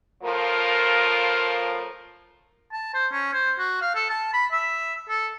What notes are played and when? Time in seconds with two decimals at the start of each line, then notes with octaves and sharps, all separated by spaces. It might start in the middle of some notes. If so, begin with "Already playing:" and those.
0.23 A2 F3 F4 A#4
2.72 A5
2.94 C5
3.12 C#4
3.33 C5
3.59 F#4
3.82 F5
3.95 A4
4.10 A5
4.33 B5
4.52 E5
5.09 A4